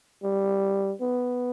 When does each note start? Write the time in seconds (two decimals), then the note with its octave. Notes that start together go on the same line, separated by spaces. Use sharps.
0.24 G3
1.01 B3